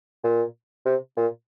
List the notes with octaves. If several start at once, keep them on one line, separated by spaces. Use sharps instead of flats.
A#2
C3
A#2